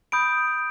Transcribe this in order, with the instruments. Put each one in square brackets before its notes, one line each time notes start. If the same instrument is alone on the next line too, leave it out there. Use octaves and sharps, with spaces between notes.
[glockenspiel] B5 D#6 G6 D7